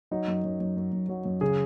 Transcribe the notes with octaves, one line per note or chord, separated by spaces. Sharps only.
F#3 D#4
F#2
F#2
F#2
F#2
F#2
F#3
F#2
C#3 G#4